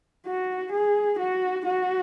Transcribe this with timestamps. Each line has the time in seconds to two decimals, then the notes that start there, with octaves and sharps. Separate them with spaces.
0.26 F#4
0.72 G#4
1.19 F#4
1.66 F#4